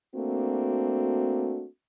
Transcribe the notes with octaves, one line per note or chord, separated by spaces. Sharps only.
A3 A#3 C4 D4 F#4